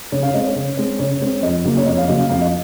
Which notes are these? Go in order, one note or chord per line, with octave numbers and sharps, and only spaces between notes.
C#3 C#5
F5
G#3 C4 D#5
C#5
C#3
G#3 C4
C#3 C#5
G#3 C4
F2 D#5
C#3 F#3 A#3
C#5
F2 D#5
F5
C#3 F#3 A#3 D#5
F5
F2 F5
D#5